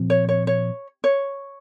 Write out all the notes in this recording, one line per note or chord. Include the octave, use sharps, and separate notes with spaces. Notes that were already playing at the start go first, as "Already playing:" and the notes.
Already playing: A#2 F3 C4
C#5
C#5
C#5
C#5